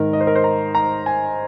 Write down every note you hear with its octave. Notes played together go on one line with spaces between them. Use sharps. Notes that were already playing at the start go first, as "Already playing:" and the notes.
Already playing: G#2 D#3 A#4
D#5
C5
A#4
C5
A#5
A#5
G#5